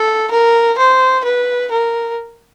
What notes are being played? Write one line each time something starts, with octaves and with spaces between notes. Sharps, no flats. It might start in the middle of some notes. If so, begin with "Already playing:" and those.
Already playing: A4
A#4
C5
B4
A#4